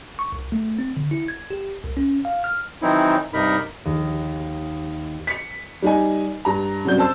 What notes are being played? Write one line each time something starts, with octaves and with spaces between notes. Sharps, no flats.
C#6
C2
A3
C4
D3
E4
G#6
G4
C2
C#4
F5
F6
D#3 E3 F#3 C4 D#4 E4
G2 C3 D#4 A#4 B5
D#2
B6 C#7
G3 D#4 D#5 G#5
G2 A#5
F#2 C3 F#3 G3 D4 G6
C5 A5 E6